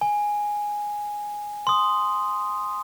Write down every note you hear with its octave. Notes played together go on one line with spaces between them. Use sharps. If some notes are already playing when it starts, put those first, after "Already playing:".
G#5
C6 D#6